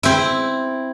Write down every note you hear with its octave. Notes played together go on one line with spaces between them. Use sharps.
C4 E4